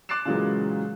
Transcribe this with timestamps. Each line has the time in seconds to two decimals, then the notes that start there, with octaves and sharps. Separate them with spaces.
0.09 D6 F#6 A6 C7 E7
0.25 A#2 C#3 E3 F#3 G#3